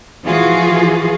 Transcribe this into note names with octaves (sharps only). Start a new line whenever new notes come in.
E3 F3 F4 F#4 G#4